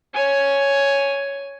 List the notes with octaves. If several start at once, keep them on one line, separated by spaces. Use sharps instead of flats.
C#5 G#5